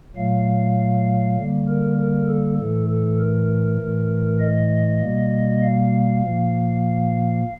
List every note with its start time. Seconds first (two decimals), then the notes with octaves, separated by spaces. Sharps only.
0.16 A#2 F#3 A3 F5
1.38 D3 G3 A#3
1.68 A#4
1.98 A#4
2.29 A4
2.59 A2 E3 A3 A4
2.89 A4
3.19 A#4
3.80 A2 E3 A3
4.40 D#5
5.01 B2 G3 A#3
5.62 F5
6.23 A#2 F3 A#3